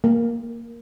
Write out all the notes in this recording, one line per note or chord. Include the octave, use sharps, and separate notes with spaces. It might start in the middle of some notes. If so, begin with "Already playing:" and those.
A#3